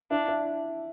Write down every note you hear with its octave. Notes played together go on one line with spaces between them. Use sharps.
D4 E4
E4